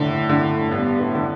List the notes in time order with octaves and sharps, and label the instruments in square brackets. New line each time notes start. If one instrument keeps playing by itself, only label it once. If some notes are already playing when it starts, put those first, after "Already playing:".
Already playing: [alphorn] A2 [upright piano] D3
[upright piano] D3
[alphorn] G2 [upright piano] B3
[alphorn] A2
[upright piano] D3